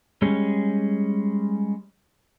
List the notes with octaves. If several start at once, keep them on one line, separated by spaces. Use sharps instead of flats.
G3 G#3 C#4